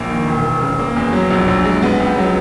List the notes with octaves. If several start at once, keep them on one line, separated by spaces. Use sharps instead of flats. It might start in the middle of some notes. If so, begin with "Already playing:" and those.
Already playing: A#1 A#3
D#3
E1
E1
C#3
A#3
E2
F#3
A#1
A#1
G#3
B3
C#2
F#3